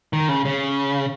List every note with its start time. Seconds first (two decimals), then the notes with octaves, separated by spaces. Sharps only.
0.13 D#3
0.29 C#3
0.45 C#3